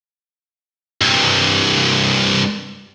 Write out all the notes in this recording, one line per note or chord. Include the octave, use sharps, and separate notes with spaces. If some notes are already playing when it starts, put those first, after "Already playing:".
C2 G2